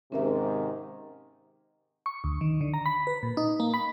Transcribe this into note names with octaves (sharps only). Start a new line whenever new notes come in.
G#2 C3 D#3 C#4 A#4 E5
C#6
D2
D#3
D3
A#5
B5
B4
A#2
D#4
A#3
B5